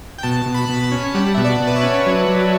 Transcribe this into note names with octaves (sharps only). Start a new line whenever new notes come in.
G5
B2 A5
B2
B5
B2
B5
A5
C#4
G3 F#5
B2 E5
D5
B2
B4
C#5
C#4
F#3
F#3